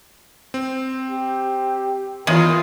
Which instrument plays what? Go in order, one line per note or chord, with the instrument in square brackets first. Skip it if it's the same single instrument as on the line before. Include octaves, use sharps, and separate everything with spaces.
[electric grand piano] C4
[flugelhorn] G4
[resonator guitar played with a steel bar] E2 [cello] F4 [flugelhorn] A#4 [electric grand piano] C#5 D#5